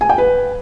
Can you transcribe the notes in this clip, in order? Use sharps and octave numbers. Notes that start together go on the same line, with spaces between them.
G#5
G5
B4